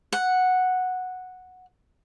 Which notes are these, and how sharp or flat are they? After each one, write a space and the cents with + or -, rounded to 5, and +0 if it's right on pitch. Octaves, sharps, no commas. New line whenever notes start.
F#5 -5